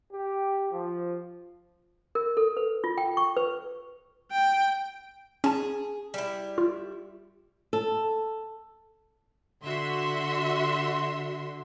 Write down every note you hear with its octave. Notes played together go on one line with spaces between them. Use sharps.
G4
F3
A#4
A4
B4
F4
G5
C#6
B4
G5
C#4 G#4 A5
G3 E4
F4
A4
D3 F#4 E5 C6